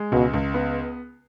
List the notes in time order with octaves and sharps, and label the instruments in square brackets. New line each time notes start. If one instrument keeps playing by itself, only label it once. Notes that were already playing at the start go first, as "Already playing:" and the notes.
Already playing: [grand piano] G#3
[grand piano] C#2 [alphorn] B2
[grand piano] C#2
B3